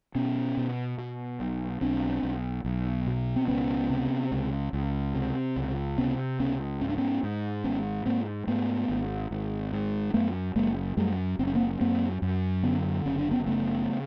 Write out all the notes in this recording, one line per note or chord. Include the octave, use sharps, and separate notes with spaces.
B2 B3 C#4
B2
B2
B1
B1 C4 D4
B1
B1
B2
C4
C#2 B3 C#4
C3
C#2
C#2
C3
C#2
C3 B3 C#4
C#2 B3 C#4
G#2 C#4
D4
B3 C#4
G#2
G#1 B3 C#4
G#2 A#3 C4
G#2 A3 B3
G#1
G#1
G#2
F#2 A3 B3
F#1 G#3 A#3
F#2 G3 A3
F#1 C4
C#4
A#3 C4
F#2 A#3 C4
F#2
D3 B3 C#4
F#1 C#4
D4
B3 C#4
C#3 A3 B3